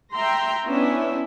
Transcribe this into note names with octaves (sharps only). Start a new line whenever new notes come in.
E5 G5 A#5 C6
B3 C#4 D4 E4 E5